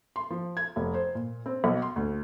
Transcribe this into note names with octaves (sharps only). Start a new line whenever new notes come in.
C6
F3
G#6
F1
C5
A#2
C4
B1
C6
D2